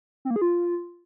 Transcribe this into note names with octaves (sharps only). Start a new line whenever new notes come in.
C4
A#3
G#4
F4